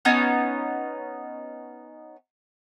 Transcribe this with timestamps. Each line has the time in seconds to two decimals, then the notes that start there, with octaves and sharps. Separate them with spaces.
0.05 B3 C#4 D#4